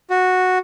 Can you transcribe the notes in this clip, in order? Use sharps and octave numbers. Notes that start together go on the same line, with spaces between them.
F#4